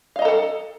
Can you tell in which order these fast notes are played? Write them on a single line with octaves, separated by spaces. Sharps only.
F5 D#5 A#5 A4 F#5